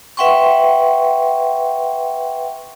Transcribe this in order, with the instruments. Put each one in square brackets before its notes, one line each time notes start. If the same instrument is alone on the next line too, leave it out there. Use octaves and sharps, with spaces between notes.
[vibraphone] B4 E5 F#5 G5 C6 C#6